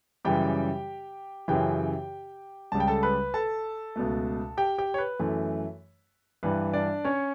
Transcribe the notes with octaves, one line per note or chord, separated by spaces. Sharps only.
F#2 C#3 E3 G3 G4 G5
F#2 C#3 E3 G4 G5
C#2 C#3 G3 A5
G5
A4 A5
B4 B5
A4 A5
C#2 B2 A3
G4 G5
G4 G5
C#5
B4
F#2 E3 A3
G2 E3 G3 B4
D4 D5
C#4 C#5